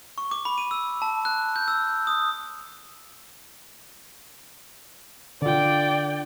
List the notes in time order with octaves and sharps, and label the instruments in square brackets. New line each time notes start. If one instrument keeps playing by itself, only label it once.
[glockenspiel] C#6
D6
B5
D#7
E6
A5
F#6
G6
E6
D#6
[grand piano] D3 F4 [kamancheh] D5 G5